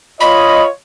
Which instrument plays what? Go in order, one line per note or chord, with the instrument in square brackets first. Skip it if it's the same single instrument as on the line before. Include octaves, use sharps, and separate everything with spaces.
[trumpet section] F4 C#5 D#5 [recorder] B5